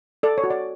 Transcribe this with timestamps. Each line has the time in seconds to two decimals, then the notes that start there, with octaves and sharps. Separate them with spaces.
0.23 A4 D5
0.38 C#5
0.44 F#4
0.50 D5